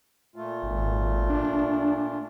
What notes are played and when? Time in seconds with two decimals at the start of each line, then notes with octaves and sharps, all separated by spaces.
0.36 A#2 A3 F4
0.63 G#1
1.30 D4